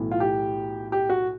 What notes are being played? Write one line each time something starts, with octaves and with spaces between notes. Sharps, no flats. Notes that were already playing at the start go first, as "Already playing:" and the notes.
Already playing: B1 A2 E3
F4
G4
G4
F#4